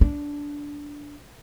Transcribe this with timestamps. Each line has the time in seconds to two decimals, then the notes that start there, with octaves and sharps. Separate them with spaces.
0.01 D4